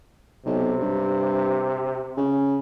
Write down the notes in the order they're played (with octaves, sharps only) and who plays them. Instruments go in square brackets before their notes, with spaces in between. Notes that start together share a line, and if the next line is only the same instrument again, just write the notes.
[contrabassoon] B1 [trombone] C3
[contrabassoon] G2
C#3